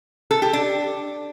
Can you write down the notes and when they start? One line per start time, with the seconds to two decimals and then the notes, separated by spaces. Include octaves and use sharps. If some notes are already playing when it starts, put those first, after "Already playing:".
0.31 A4
0.42 G4
0.53 D4